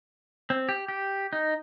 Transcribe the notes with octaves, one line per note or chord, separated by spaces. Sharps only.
C4
G4
G4
D#4